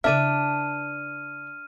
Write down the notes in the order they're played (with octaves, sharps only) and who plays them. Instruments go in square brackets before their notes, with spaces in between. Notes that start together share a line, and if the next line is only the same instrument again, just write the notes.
[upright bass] C#3 E4 [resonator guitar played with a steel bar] D4 [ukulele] B4 D5 E5 [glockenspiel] F6 D#7